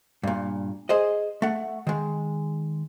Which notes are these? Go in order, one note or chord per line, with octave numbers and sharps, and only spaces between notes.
G2 A#2
G#4 C5 D#5
A3 F#5
D#3 G#3